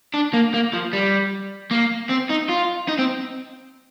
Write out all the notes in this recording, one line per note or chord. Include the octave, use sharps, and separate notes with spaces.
D4
A#3
A#3
F3
G3
A#3
C4
D#4
F4
D#4
C4